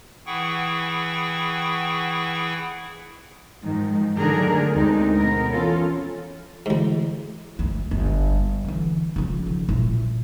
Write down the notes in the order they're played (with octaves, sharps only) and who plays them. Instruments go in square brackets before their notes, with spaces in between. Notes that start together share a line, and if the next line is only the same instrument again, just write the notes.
[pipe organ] E3 E4 G#4 F#5 G5 C#6
[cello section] G#2 D#3 F3
D3 D#3 F#3 A3 G#4 A#4
D2 G#3 C4 D#4
B2 B3 C4 A#4
E3 C#4 F4 A4
[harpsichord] D2 G#2 [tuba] E3
[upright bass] G1 D2
G1
D3 E3
C#3 F3
D#3
A#2 E4